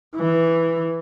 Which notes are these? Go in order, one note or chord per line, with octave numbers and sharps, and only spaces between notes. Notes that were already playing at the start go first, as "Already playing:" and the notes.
E3